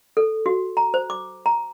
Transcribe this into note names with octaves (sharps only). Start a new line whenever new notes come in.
A4
F#4
A#5
C5
D6
A#5